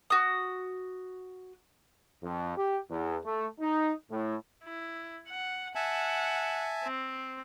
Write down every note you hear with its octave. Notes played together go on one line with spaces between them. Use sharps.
F#4 D#6
F2
G4
E2
A3
D#4
A2
E4
F#5
E5 F#5 G#5 A5
C4